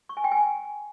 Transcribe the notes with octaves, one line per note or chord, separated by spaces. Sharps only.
C#6
G#5
G5
G#5